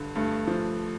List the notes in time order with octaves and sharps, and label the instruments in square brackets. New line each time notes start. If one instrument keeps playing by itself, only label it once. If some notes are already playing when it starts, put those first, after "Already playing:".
Already playing: [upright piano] G2 D3
[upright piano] G2 [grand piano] A3
[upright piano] F3